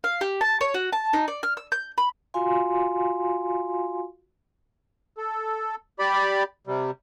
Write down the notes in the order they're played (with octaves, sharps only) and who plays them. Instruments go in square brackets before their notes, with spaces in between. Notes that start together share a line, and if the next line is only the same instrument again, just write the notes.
[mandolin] F5
G4
A5
C#5
F#4
A5
D#4
D5
F6
E6
G6
B5
[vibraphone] F4 F#4 F5 G#5 C6
[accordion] A4
G4 D5 B5
C3 G3